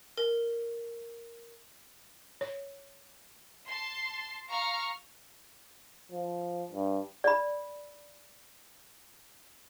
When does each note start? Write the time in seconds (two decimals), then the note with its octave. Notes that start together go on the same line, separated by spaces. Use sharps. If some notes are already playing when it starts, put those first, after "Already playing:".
0.18 A#4
2.41 C#5
3.66 A5 C6
4.49 F5 A#5 C#6 F6
6.12 F3
6.72 G2
7.24 D5 B5